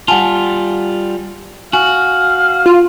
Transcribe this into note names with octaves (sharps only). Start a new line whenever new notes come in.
G3 F4 F#5 G#5 A5
F#4 F5 G#5
F4